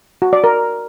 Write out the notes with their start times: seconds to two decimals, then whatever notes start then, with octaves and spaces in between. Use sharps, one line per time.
0.22 F#4
0.33 D5
0.44 A#4